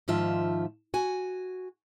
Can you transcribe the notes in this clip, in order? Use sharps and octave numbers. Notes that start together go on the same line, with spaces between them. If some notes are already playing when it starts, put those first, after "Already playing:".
G#2 D#3 F3 F4 E5 A5
F#4 G#5